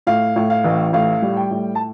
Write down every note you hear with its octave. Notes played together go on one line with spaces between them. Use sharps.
A2 F5
A2
F5
A1
A2 F5
G3
G5
A2
A5